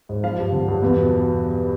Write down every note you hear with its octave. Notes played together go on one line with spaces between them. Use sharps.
G#2
F3 F5
G2
D3
G2
E2
B2
B2